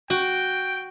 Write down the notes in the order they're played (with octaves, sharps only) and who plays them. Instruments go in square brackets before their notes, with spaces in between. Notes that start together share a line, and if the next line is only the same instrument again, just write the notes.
[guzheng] F#4 [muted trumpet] G5